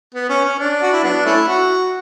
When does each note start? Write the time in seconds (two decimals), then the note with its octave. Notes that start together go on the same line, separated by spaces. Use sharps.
0.14 B3
0.29 C#4
0.44 C#4
0.59 D4
0.82 F#4
0.93 E4
1.04 F#3 B3 D4
1.25 A3 C#4 E4
1.48 F#4